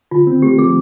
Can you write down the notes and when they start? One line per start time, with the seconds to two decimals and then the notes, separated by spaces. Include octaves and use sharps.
0.11 D3 F4
0.27 C4
0.42 A3 G4
0.58 F3 G#4